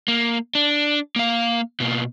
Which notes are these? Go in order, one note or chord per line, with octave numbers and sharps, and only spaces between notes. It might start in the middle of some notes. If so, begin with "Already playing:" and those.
A#3
D4
A#3 F5
B2 A#3